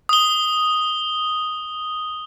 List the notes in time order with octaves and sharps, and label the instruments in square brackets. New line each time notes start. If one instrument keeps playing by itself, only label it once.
[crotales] D#6 G7